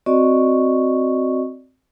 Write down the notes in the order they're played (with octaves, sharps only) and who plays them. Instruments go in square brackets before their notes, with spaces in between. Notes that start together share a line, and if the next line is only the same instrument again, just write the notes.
[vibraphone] C4 F#4 D5 D#5 C#6